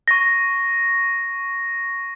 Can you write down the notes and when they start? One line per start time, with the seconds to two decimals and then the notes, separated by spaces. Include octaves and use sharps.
0.08 C#6 A#6